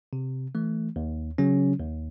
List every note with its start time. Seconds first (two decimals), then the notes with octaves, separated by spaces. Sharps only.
0.13 C3
0.55 E3 A3
0.96 D#2
1.38 C#3 F#3 C#4
1.80 D#2